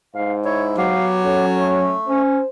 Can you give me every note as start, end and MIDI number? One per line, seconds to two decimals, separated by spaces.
0.15 1.01 44
0.15 0.34 77
0.45 0.77 64
0.45 0.66 73
0.78 1.95 54
0.78 1.46 59
0.78 1.46 67
0.78 1.07 77
1.25 1.94 61
1.25 1.77 69
1.59 2.22 57
2.07 2.40 61
2.07 2.48 72